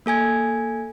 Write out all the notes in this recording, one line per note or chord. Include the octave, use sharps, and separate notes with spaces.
A#3 A4 G#5 G#6